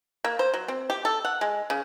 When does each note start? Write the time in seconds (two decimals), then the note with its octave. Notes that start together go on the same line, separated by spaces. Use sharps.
0.24 A#3
0.39 C5
0.54 F#3
0.68 C4
0.90 G4
1.05 A4
1.25 F#5
1.41 G#3
1.70 C#3